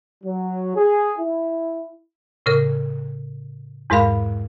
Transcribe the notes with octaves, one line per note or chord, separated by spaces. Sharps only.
F#3
G#4
E4
A2 C#3 A#4
E2 G#2 G#3 A#4 F5 B5